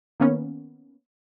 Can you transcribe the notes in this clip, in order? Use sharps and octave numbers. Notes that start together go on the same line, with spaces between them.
D#3 A#3 B3 C#4